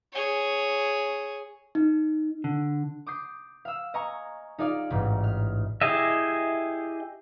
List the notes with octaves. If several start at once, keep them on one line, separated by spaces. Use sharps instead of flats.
G#4 C#5
D#4
D3
D6 D#6 G6 C7
F5 E6
D#5 G#5 A#5 C#6
D#4 F4 G#4 D5 F5
A1 G#2
F6
E4 G4 G#4 D#5 E5